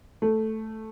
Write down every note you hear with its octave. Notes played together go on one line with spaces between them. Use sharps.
A3